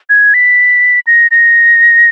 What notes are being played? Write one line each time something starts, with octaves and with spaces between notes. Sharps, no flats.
G#6
B6
A#6
A#6